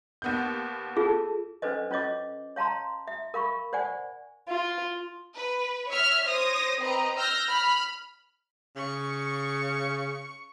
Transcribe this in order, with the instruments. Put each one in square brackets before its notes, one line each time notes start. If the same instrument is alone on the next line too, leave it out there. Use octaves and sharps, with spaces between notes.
[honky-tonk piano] D#2 B3 G6
[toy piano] F4 G#4 [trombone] A4
[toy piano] C#4 D4 A4 B4 C5 D#5
C#4 F4 C#5 D#5 D6
C#5 F5 A5 A#5 C6
E5
A#4 F5 B5 C#6
C5 D5 F#5 G#5
[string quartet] F4
[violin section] B4
C#5 E5 F6
C5 C#5 D#6 A#6
C4 B4 D#5 A#5
E6 F6 G6 A#6
B5 F6
[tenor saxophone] C#3 [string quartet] C#6